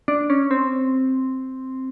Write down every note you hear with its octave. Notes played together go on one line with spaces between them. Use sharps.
D4
C#4
C4